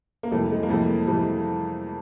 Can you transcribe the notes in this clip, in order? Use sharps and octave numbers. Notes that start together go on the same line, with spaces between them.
A#3
F2 C3 E3 G3 A3
G#3
A#3
F2 C3 E3 G3 A3
F2 C3 E3 G3 A3